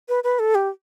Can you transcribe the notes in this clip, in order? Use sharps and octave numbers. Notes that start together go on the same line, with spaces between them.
B4
B4
A4
G4